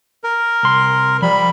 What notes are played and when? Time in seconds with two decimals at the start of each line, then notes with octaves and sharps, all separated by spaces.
0.24 A#4
0.63 C2 C6
1.22 F3 G3 B5